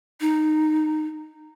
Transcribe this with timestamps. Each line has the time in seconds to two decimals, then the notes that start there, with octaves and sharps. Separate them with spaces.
0.21 D#4